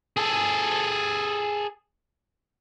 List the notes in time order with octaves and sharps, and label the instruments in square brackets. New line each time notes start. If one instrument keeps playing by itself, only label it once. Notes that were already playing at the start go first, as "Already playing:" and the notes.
[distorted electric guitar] G#4 A4